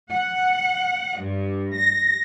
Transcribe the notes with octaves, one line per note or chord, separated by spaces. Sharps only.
F#5
G2
A#6